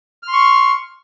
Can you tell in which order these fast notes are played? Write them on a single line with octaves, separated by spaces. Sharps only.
F6 C6 C#6